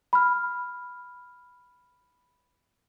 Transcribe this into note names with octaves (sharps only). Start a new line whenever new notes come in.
B5 F6